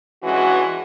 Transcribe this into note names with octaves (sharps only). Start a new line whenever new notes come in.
G2 E3 G#3 C#4 F#4